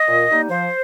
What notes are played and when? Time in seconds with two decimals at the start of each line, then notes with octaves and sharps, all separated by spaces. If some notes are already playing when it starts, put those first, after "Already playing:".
Already playing: D#5
0.08 A#2
0.29 G3 A#3 D#4
0.50 F3 C5